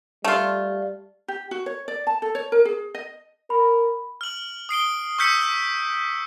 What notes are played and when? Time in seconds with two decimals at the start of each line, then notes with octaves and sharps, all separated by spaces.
0.24 G3 A3 F4
1.28 G4
1.51 F#4
1.66 C#5
1.88 D5
2.07 A5
2.22 A4
2.35 C#5
2.52 A#4
2.65 G#4
2.95 D#5
3.50 A#4 B5
4.21 F6 F#7
4.69 D#6 C7 D7 G7
5.18 C#6 E6 F6 G6 B6 C#7